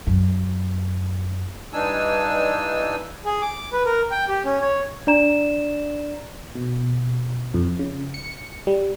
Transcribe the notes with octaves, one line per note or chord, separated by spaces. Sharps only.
F#2
G2 E3 D4 D#4 G#5 E6
G#4
D6
B4
A#4
G5
G4
C#4
C#5
D4 D5 A#5 E7
B2
F2
C#3
C#7
G3